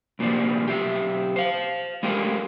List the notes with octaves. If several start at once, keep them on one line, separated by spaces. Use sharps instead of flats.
C2 A#2 D3 F3 G3
B1 G4 E5
C5 F5
G#3 A3 F4 G4 A#4